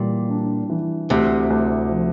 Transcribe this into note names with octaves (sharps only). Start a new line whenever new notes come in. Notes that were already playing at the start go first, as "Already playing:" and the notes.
Already playing: A#2 E3 G3
D4
E3
D2 C3
D2
F3